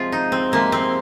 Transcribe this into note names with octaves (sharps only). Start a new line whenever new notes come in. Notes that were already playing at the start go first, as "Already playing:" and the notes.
Already playing: C3 F3 G#3 A#3 C4 F4 G#4
D#4
C4
C3 F3 G#3 A#3
C4